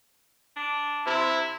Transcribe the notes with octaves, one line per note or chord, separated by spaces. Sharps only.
D4
C3 E4